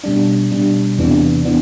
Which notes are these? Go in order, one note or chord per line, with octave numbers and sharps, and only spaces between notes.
B2 G3 D4
B2 G3 D4
E2 C3 E3 B3 D4
E3 B3 D4